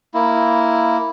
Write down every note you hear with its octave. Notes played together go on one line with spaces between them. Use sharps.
A#3 E4